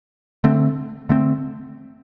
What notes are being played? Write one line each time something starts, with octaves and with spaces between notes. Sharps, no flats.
D3 A3 C4
D3 A3 C4